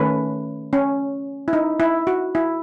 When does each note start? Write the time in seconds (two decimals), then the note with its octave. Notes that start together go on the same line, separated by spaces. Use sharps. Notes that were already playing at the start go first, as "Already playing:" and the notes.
Already playing: D#3 A3 C#4 B4
0.73 C#4
1.48 E4
1.53 D#4
1.80 E4
2.07 F#4
2.35 E4